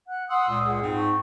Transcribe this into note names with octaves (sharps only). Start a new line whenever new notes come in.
F#5 F#6
F#5 C6 D#6 E6
C#2 A#2
G#4 F#5
G#2 C4
D#4 A5 C#6